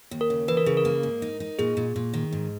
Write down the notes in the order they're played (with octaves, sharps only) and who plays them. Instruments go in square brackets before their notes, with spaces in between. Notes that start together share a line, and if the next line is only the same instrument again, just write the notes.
[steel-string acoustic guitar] D#2
[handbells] A#4
[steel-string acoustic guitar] C#3
[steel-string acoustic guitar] E3 [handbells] B4
[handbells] A#4
[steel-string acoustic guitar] C#3 [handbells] G#4
[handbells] A#4
[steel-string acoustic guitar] A#3
G#2
D#4
D#4
[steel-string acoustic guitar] A#2 [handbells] G#4
[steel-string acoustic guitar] A#2
A#2
D#3
G#2